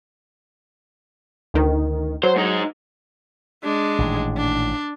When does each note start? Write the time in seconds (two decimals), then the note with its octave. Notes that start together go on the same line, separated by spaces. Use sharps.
1.54 D2 D#3
2.23 F#3 C5
2.36 G#2 D#4
3.64 G#3 D4
3.99 A1 A#2 D#3
4.37 D4